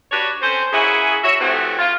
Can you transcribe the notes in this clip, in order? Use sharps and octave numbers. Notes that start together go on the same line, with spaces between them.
D4 F#4 G4 B4 C#5
C4 C#4 A4 C5
A#3 C#4 E4 F#4 G#4
F#4 C#5 E5
C3 E3 F3 A3 C4 F#4
F4